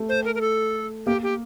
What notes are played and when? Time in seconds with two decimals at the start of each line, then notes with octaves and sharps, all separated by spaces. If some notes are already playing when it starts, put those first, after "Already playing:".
Already playing: A3
0.09 C5
0.25 A#4
0.35 A#4
0.41 A4
1.06 A#3 G4
1.23 G4